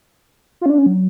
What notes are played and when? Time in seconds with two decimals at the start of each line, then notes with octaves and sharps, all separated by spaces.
0.61 F4
0.66 C#4
0.70 D4
0.78 C#4
0.86 F#3